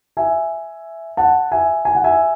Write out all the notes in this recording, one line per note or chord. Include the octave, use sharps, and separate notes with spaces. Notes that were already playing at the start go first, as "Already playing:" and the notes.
E5 G#5
F#5 A5
E5 G#5
G#5
F#5
E5 G#5